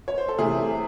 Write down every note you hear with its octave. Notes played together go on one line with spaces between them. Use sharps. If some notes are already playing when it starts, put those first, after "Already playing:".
C#5
C5
A4
C3 E3 A3 C4 G#4